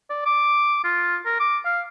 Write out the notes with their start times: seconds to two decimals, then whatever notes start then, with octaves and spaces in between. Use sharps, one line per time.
0.10 D5
0.26 D6
0.84 F4
1.26 A#4
1.40 D6
1.65 F5